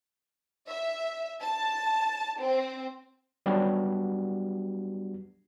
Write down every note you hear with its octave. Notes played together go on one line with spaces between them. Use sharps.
E5
A5
C4
F#3 G3 B3 D4 F#4 G4